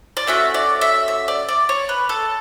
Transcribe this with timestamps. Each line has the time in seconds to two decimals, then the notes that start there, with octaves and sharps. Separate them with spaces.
0.17 D5
0.27 A3 C#4 F#4 E5
0.54 D5
0.81 E5
1.08 E5
1.28 D5
1.49 D5
1.69 C#5
1.89 B4
2.09 A4